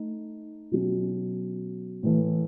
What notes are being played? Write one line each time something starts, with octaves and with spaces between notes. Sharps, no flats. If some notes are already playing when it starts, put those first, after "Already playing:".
Already playing: A3 D#4
B2 F#3 C#4
A2 E3 A3